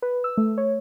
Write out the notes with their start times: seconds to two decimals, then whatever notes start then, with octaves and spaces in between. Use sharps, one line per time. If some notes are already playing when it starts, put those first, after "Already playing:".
0.02 B4
0.24 E6
0.37 A3
0.58 C#5